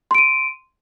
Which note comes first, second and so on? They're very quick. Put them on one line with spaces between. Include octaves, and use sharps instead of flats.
C6 D7 D#7